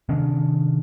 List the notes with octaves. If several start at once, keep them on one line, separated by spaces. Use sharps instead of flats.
C3 D#3 C#4 D4